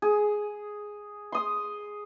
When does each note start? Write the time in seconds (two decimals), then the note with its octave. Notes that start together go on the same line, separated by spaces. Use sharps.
0.02 G#4
1.32 C6 D#6